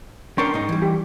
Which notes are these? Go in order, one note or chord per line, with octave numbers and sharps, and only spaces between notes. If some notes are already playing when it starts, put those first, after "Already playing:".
C#4 D4 A#4 G5 C6 C#6
G#2 D#4
E3 G3
G4